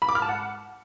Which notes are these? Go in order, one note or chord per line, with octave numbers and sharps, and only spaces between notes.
B5
D6
F6
A5
F#5